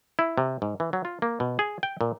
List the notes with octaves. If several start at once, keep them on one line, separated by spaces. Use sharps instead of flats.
E4
C3
G#2
E3
F#3
F4
A#3
B2
G#4
G5
A#2